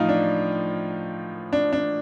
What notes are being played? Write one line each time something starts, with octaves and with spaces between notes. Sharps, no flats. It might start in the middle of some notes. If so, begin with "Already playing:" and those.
Already playing: A2 F3 D#4 F4
D4
D4
D4